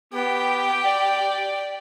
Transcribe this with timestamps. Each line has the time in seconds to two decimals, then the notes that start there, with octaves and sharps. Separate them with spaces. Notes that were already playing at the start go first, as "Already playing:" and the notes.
0.14 B3 G4 G5
0.85 D5